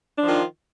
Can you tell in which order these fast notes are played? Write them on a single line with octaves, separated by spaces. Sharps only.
D4 F3 F4 D#3